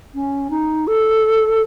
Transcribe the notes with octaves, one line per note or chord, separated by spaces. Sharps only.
C#4
D#4
A4